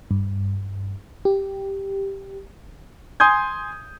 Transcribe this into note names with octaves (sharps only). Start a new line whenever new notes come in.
G2
G4
G#5 C6 D#6 G6 G#6